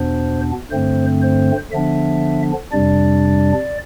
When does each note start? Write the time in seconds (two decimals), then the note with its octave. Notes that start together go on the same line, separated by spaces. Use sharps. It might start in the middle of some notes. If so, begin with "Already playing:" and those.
Already playing: E2 B2 B3 D4 C5
0.71 G2 D3 A3 C4 C5
1.22 C5
1.71 D3 F3 B3 D4 E5
2.72 F2 C3 G3 D4 D5